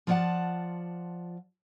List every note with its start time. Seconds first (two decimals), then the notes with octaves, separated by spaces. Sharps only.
0.07 F3 F4 C#5 D5 F#5 A5